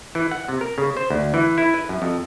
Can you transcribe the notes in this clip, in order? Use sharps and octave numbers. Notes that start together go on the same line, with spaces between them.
E3
F#5
C3
A#4
C#3
C5
D2
E3
E4
B4
F#2
F2